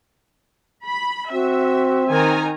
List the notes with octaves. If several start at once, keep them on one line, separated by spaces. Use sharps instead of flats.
B5
C4 F#4 E5
D#3 A#4 G#5 A#5